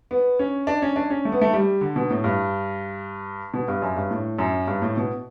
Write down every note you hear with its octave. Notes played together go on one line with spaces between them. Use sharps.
B3
C#4
D4
C#4
D4
C#4
A3
B3
A3
G3
D3
B2
A2
G2
B2
G2
F#2
G2
A2
F#2
G2
A2
B2